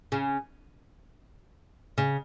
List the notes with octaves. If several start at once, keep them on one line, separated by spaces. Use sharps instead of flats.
C#3
C#3